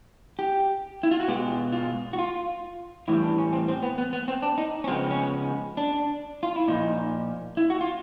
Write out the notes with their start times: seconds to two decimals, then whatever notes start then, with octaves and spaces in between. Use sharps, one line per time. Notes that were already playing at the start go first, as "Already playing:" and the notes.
0.39 G4
1.03 E4
1.11 F4
1.20 F#4
1.28 B2 G#3 B3 G4
1.51 F4
1.72 F4
2.13 F#4
2.19 F4
3.08 A2 E3 G3 E4
3.23 D4
3.38 C#4
3.53 C4
3.68 C4
3.83 B3
3.98 B3
4.13 B3
4.28 C4
4.42 D4
4.58 D#4
4.84 C#4
4.88 C#3 F3 G#3 B3 C4
5.10 C#4
5.77 D4
6.43 F4
6.56 E4
6.68 A#2 F3 A#3 D#4
7.57 E4
7.70 F#4
7.81 F4